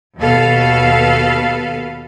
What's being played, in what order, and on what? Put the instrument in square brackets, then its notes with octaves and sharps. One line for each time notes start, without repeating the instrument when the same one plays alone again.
[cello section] D#2 B2 A4 B4 F5